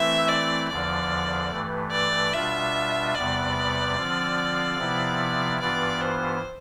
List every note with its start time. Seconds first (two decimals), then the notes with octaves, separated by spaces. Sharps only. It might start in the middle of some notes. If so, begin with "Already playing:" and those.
Already playing: E3 A3 C4 E4 E5
0.28 D5
0.69 E2 D3 F3 D5
1.51 G2 E3 A3
1.91 D5
2.33 B2 G3 D4 F4 E5
3.14 E2 C3 G3 B3 D5
3.97 D3 F3 C4 F4
4.78 C3 F3 B3 E4
5.60 G2 E3 B3 F4 D5
6.01 C5